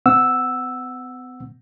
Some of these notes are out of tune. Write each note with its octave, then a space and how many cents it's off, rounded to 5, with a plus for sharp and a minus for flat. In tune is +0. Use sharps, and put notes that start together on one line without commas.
B3 +45 F#5 +0 E6 +0